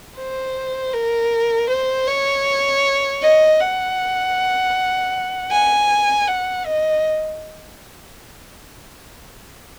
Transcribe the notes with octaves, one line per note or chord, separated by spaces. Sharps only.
C5
A#4
C5
C#5
D#5
F#5
G#5
F#5
D#5